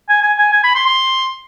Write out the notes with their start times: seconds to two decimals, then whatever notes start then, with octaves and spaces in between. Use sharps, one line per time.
0.09 G#5
0.23 G#5
0.38 G#5
0.53 G#5
0.64 B5
0.75 C6
0.86 C6